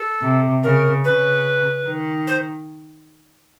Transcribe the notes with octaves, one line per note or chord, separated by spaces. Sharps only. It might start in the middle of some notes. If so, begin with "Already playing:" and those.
Already playing: A4
C3
C#3 A#4
C#3 B4
D#3
C5